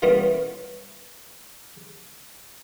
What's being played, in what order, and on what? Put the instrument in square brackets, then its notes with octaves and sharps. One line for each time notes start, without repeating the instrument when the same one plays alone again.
[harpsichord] E3 G3 A#3 B3 C#4